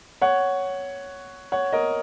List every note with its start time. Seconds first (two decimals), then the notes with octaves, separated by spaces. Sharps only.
0.21 C#5 F#5
1.52 C#5 F#5
1.73 A#4 D#5